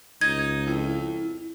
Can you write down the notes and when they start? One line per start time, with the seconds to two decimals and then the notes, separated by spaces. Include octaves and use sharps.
0.21 C#2 D#4 G#6
0.66 F2 E4